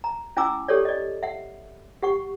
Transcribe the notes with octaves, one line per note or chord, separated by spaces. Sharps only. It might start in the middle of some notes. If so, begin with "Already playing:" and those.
A#5
C#4 E4 G#5 A#5 D6 E6
G4 A4 C#5 D5
D5 D#5
E5 F#5
G4 F#5 C#6